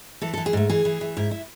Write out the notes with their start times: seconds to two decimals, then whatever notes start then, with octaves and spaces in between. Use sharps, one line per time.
0.21 E3 A4
0.33 A4
0.37 E3
0.46 G#4
0.53 G#2 A3
0.69 E3 G#4
0.85 E3
1.01 E3
1.17 G#2 E4
1.31 E4